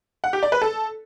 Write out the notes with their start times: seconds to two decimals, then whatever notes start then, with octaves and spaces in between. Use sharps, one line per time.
0.24 F#5
0.33 G4
0.43 D5
0.52 B4
0.62 A4